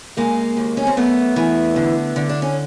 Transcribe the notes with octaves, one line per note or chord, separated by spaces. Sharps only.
C#3 G#3 A#3
D#2
C#4
C4
F#2 A3 B3
E3
D3
D3
D4
C#4